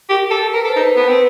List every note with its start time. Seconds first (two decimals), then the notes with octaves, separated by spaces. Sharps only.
0.09 G4 A#4
0.31 A4
0.54 A#4 B4
0.65 A4
0.68 C5
0.76 D#4
0.83 B4
0.96 B3 B4
1.08 C4